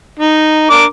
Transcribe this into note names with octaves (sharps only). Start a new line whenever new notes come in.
D#4
D4 A#4 D6